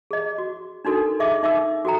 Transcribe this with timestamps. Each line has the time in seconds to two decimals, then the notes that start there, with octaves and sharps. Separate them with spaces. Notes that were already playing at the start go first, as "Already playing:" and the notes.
0.11 G#4 D#5
0.38 F#4
0.85 D4 D#4 F#4 A4 A#4
1.19 G#4 D#5 E5 D6
1.43 D#4 E5 D6 E6
1.85 F#4 A4 G5 A#5